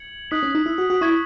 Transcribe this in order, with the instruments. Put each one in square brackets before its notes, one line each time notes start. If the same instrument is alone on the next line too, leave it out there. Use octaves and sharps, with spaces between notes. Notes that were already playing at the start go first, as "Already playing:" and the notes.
Already playing: [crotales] G#6 C#7 F#7
[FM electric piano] D#4 [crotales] D#6 F#6 B6 F#7
[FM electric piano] C#4
D#4
E4
F#4
F#4
[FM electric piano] E4 [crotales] C#6 G#6 B6